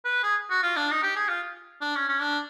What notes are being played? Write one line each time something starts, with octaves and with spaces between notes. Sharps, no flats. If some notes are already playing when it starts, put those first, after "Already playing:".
B4
G#4
F#4
F4
D4
D#4
G4
G#4
F4
D4
C#4
C#4
D4